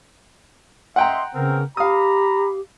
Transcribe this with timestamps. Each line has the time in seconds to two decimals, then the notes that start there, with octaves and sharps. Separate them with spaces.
0.96 D#5 E5 F#5 G5 A#5 C6
1.34 C#3 B3 C4 A#4
1.77 G4 F5 A#5 B5 D#6